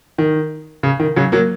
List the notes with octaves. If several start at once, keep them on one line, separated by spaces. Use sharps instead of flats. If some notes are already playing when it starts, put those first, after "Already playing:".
D#3
C#3
D#3
C#3 F#3
F#3 A#3